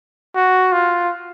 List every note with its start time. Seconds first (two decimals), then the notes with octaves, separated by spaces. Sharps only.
0.35 F#4
0.72 F4